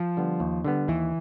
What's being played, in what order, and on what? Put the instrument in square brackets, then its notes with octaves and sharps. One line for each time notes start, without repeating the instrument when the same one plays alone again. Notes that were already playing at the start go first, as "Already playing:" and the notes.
Already playing: [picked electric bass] F3
[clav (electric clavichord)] D3 G3 B3
D#2
D3 G3 B3
[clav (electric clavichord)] D#2 [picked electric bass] E3